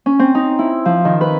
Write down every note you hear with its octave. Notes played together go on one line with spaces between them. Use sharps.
C#4
C4
D#4
E4
F3
D#3
B4